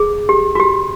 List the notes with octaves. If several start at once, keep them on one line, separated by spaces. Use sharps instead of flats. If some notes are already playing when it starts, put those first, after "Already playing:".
Already playing: G#4
G4
F#4
G4